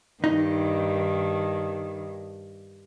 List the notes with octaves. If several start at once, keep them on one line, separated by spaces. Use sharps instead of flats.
G2 D#3 D#4